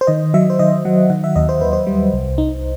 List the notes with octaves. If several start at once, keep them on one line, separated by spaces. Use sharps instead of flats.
C5
D#3 D#5
F#3 E5
C5
D#3 D#5
F#3 F#5
D#3 F#5
E5
D#2 D#5
C5
D#2 B4
C5
G3
C2
D#4